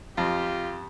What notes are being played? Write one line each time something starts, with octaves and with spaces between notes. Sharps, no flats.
F2 F4 G4